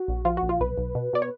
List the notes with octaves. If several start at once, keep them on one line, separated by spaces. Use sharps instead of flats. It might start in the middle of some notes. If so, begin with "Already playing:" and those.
Already playing: F#4
A#1
F3 F4
F#4
A#1
F4
B1 B4
B1
B2
B2 D5
C#5